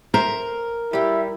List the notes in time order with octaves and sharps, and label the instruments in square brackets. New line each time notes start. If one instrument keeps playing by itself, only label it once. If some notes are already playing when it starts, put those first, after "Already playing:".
[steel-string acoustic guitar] A#4 [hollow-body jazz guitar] C5 E5 A#5
[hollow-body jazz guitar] G3 G4 [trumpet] E4